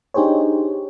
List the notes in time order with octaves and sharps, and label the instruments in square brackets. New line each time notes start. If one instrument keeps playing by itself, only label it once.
[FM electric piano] D4 D#4 G4 G#4 C5 C#5